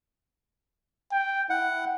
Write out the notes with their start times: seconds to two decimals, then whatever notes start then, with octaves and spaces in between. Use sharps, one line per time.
1.12 G5
1.50 E4 F#5